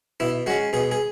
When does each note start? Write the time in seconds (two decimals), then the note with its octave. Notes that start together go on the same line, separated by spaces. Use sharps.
0.20 B2 E4
0.46 G#3 C#4 F#4
0.73 B2 G#4
0.91 G#4